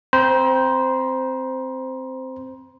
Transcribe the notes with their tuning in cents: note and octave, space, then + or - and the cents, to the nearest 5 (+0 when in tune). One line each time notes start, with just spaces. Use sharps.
C4 +0 C5 -10 A#5 +35